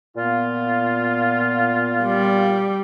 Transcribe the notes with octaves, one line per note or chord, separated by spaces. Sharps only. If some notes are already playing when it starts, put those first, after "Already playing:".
A#2 B3 F4
G3